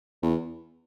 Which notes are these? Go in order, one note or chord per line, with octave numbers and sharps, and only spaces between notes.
E2